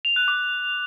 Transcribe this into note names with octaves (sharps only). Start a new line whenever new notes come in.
F7
F#6
D6